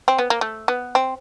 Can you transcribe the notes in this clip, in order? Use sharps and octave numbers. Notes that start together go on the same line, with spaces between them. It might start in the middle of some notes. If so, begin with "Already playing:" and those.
C4
B3
A#3
A3
B3
C4